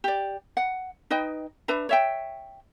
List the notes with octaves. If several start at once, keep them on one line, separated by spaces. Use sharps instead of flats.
G4 D5
F#5
D#4 B4 D#5 G5
D4 B4 E5 A#5
C#5 E5 G5